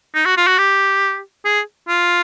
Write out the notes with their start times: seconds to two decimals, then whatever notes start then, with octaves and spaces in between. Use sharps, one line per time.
0.15 D#4
0.26 F#4
0.37 F4
0.47 F#4
0.58 G4
1.45 G#4
1.88 F4